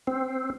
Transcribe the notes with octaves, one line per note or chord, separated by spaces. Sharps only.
C4